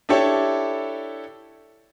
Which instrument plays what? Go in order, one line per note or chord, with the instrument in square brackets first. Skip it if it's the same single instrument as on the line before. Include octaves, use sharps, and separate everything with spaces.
[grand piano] D4 E4 G4 A4 C#5